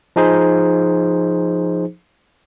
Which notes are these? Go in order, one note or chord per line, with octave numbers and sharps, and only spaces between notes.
F3 D#4 G#4 C5